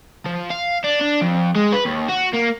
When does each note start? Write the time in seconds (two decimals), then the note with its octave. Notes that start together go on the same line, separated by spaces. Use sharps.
0.26 F3
0.50 F5
0.84 D4
1.01 D4
1.22 F2
1.56 G#3
1.73 B4
1.85 D#2
2.09 F#4
2.33 A#3